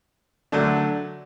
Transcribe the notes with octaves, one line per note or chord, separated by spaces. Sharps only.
D3 F#3 A3 D4